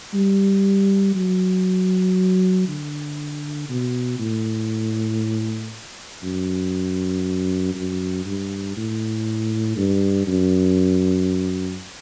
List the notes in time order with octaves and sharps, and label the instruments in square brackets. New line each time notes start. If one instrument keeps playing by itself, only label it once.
[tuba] G3
F#3
D3
B2
A2
F#2
F#2
G2
A2
G2
F#2